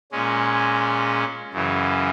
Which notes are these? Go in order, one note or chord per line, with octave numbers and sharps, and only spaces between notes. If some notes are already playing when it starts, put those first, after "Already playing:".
A#2 G#3 C#4
F#2 C#3 E3